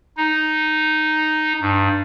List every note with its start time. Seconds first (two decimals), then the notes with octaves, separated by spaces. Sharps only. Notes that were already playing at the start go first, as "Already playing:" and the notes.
0.17 D#4
1.61 G2